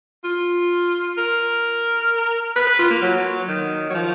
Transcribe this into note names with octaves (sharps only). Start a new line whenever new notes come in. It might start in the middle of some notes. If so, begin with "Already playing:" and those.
F4
A#4
B4
B4
F4
A#3
F#3
D#3
F#3
F3